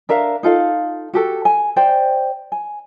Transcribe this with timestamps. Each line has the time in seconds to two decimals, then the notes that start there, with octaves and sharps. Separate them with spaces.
0.09 D4 A#4 E5 F5
0.43 D#4 F4 A4 F5
1.14 F#4 G4 A4
1.45 G#5
1.76 C5 D5 G5
2.52 G#5